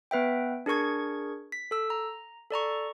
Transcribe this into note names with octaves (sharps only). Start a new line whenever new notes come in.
B3 B4 E5 G5
D4 G#4 A#4 C#6 G#6
B6
A4 E6
A#5
A4 D5 A#5 C#6